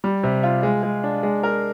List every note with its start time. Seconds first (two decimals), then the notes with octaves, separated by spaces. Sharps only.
0.04 G3
0.23 C3
0.43 F4
0.63 G#3
0.83 G#3
1.03 D4
1.23 G#3
1.43 A#4